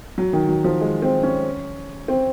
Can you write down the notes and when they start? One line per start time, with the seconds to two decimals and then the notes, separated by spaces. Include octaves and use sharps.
0.18 F#3
0.33 D#3
0.49 F#3
0.64 F3
0.81 G#3
1.02 C4
1.23 C#4
2.08 C4